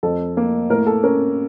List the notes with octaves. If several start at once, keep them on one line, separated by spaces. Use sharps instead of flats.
F2 A4
A#3
A2 A#4
A4
C#4 A#4